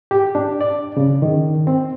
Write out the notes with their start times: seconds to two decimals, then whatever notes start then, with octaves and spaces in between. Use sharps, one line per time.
0.11 G4
0.35 D4
0.61 D5
0.97 C#3
1.22 D#3
1.67 C4